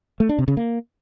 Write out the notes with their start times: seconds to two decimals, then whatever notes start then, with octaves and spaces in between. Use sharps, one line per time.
0.20 A3
0.29 D4
0.38 C3
0.48 C#3
0.57 A#3